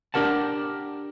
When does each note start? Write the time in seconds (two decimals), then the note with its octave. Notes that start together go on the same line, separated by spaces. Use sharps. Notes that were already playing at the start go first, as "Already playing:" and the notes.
0.14 D4 G4 A#4 F#5 A5